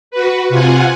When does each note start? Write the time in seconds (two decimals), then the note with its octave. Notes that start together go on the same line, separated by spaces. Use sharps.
0.11 F#4 B4
0.49 C3 F4 F#5 G#5